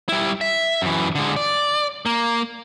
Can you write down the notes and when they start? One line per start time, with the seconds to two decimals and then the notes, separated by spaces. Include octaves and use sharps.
0.09 G3 E4
0.41 E5
0.82 F#2 E3
1.15 D3 G#3
1.36 D5
2.06 A#3